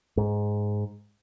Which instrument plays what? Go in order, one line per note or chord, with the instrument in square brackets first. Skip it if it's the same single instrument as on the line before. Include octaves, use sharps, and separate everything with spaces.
[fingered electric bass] G#2